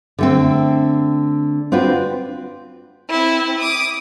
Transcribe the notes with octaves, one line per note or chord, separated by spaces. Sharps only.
D3 A3 C4
C4 D4 F4 F#4 B4
C4 E4
D6 D#6